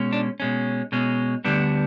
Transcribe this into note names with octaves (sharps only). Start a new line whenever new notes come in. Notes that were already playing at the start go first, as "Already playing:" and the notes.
Already playing: B2 G#3 C#4
D4
B2 G#3 C#4
B2 G#3 C#4
D2 D3 G3 B3 D4